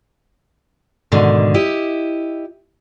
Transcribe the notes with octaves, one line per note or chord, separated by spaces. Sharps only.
G#2 B2 D3 D#3
E4 G4 D#5